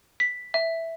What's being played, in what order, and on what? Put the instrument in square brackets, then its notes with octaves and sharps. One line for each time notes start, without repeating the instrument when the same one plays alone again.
[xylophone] B6
E5